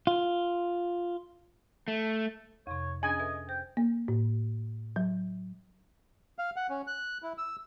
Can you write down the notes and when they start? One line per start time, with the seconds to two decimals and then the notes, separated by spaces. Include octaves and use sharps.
0.07 F4
1.88 A3
2.67 F2 C3 C#5
3.03 C#4 D4 G#4 D#5 G#5
3.19 A4 B4 E5
3.49 C5 G5
3.77 A#3
4.08 A2
4.96 F#3
6.39 F5
6.56 F#5
6.70 C#4
6.87 F#6
7.23 E4
7.38 E6